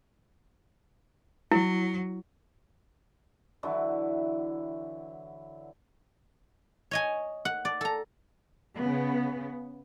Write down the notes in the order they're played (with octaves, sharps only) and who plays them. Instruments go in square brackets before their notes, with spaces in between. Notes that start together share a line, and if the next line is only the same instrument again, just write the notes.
[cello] F#3 [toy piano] E4
[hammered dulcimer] D3 E3 F#3 E4
[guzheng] C#5 D#5 G#5
F#5
D5
A4 A#5
[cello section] C#3 B3